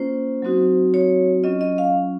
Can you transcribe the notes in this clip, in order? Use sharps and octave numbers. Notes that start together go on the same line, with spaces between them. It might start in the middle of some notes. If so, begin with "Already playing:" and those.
Already playing: A#3 C#4 F4 C5
F#3 C4 D#4 F#4
C#5
F#3 C#4 F4 D#5
D#5
F5